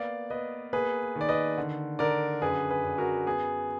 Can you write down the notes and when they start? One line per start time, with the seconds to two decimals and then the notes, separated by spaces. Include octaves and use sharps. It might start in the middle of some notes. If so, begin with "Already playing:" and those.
Already playing: A#3 B3 D5 F5
0.30 B3 B4 D#5
0.73 A#3 G#4 B4
1.16 D#3
1.21 D5
1.29 B4 D#5
1.58 D3
1.99 D3 A#4 D5
2.41 F#2 G#4 B4
2.70 G#4 B4
2.84 F#2
2.98 F#4 A#4
3.26 B3 G#4